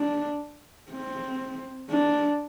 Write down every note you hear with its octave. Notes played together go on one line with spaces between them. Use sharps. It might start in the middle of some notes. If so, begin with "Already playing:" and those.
Already playing: D4
C4
D4